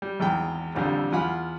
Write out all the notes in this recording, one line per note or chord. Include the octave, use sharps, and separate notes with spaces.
G3
G#1 E2 G5
A1 F2 D3 G3
E2 F4 F#5 G#5 B5